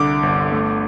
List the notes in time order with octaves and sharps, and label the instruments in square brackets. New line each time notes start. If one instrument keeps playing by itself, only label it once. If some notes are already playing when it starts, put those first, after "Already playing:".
Already playing: [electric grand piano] C2 D3 D6
G1
A3